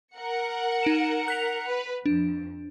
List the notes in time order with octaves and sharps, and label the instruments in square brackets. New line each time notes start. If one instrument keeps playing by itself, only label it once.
[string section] A#4 F#5 C#7
[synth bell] D#4 D7 E7
F#6 B6 F7
[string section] B4
[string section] F2 [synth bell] D4